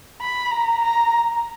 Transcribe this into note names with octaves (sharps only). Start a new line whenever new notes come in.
B5
A#5
A#5